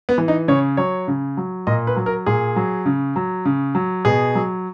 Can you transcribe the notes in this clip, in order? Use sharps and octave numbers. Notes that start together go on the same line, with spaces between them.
B3
E3
D#4
C#3 C#5
F#3 C#5
C#3
F#3
A#2 D#5
B4
F#3
A#4
A#2 G#4
F#3
C#3
F#3
C#3
F#3
B2 G#4
F#3